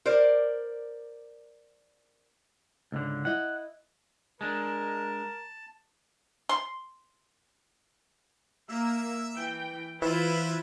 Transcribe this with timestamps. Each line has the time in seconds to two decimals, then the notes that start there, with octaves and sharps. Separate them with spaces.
0.06 A#4 C5 D5
2.92 C#2 G#2 D3
3.25 E4 D#5 F#5
4.41 G#3 D4 A#4 A5
6.49 C6
8.69 A#3 E5 E6
9.36 E3 G5
10.02 E3 E4 F4 B4 C5 E5